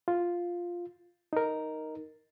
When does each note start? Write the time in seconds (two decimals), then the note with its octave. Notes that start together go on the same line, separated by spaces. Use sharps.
0.08 F4
1.33 D#4 A#4